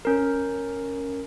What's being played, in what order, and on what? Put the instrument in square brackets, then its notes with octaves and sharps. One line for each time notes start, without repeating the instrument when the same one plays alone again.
[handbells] C#4 A#4